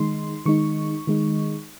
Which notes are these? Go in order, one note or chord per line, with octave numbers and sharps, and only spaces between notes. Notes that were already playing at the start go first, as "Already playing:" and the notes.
Already playing: D#3 G#3 D#4 C6
D#3 G#3 D#4 C#6
D#3 G#3 D#4